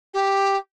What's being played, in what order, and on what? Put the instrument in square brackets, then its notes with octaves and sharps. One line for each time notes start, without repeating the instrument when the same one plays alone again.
[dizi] G4